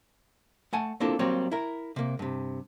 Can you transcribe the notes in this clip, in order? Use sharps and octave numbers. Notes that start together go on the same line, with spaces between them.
A3 F#5 G#5 A5
A#3 C4 D4 E4 F4 A4
F#3 G3 A#3 C4 G4 C#5
E4 A#4
C3 A#3
G2 C3